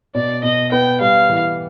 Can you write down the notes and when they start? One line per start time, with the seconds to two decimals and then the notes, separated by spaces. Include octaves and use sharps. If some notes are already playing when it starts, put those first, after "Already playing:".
0.15 B2 D5
0.43 B2 D#5
0.72 B3 G5
1.01 G3 F5
1.29 E3